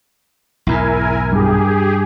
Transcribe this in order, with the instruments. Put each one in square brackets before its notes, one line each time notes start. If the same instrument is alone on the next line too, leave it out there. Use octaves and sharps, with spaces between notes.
[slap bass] B1 E2 G#2 [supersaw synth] E4 A#4 G#5
[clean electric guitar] G2 [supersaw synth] G4 G#4